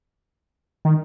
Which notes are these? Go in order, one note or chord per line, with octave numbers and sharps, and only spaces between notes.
D#3